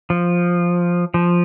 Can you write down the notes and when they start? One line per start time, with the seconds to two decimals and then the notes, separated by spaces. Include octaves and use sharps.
0.10 F3
1.14 F3